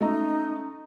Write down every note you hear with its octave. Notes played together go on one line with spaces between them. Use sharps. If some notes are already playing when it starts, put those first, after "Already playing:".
A3 C#4 D#4 D#5 A#5